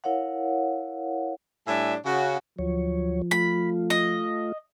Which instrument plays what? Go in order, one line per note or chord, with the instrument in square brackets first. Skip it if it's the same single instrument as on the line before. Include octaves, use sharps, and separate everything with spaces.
[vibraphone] E4 A#4 C#5 F5 F#5
[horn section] A2 G3 D4 E5 G#5
C#3 F#4
[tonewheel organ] D2 F#3 C#5 [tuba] F3
[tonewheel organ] A3 F4 [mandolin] B5
[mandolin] D#5